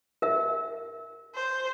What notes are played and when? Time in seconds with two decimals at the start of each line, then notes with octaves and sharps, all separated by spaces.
0.22 A#4 E5
1.35 C5